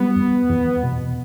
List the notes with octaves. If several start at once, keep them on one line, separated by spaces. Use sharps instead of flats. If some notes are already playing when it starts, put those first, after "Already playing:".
Already playing: G3 B3
E2
E2
B2